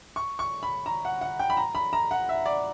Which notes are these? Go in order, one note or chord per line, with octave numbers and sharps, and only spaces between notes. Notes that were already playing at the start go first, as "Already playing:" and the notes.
C#6
C#6
B5
A#5
F#5
F#5
G5
B5
A#5
B5
A#5
F#5
E5
D5